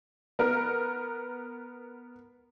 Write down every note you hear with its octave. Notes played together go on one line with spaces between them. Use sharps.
B3 A#4